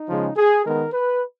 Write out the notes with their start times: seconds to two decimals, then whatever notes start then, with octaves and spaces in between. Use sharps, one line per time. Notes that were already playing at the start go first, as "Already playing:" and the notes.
Already playing: D#4
0.08 C#3 F3 G#3
0.36 G#4
0.64 D#3 G#3 B3 A#4
0.92 B4